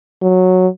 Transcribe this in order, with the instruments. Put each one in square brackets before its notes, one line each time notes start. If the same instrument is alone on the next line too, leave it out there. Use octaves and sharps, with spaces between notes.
[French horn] F#3